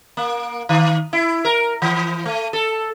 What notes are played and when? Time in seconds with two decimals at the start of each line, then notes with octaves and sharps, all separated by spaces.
0.17 A#3
0.69 D#3
1.13 E4
1.45 A#4
1.82 E3
2.26 A3
2.53 A4